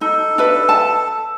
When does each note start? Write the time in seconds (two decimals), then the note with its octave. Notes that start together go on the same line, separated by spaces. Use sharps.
0.01 D#4 A4
0.38 D4 B4 E5
0.69 A5